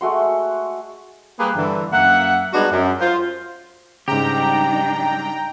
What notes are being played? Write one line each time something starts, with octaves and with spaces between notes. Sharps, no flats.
G#3 A3 F#4 C6
G3 A#3 G4 G#4 B4
G2 D3 E3
F#2 A#3 E5 F#5
G3 G#3 B3 D4 D#4 F#4
F#2
F4 C5
G#2 C#3 G3 D4 D#4 G4 G5 A#5